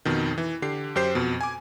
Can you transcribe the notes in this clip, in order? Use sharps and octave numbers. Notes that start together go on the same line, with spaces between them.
F2 B2 D#3
E3
D3 G4 C7
F#2 G4 C5 C7
F2 B2
G#5 D6